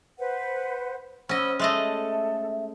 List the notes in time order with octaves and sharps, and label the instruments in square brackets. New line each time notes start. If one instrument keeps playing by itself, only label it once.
[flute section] B4 C5 F#5
[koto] C#4 D#5 [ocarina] C5 [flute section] F#5 B5 E6
[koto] G#3 A3 D#5 [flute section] A4 [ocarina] E5